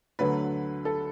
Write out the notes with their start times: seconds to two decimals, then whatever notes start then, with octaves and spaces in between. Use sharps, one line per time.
0.19 D2 D3 F#3 B4
0.85 A4